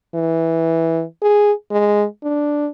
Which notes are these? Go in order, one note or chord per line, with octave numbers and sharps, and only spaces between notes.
E3
G#4
G#3
D4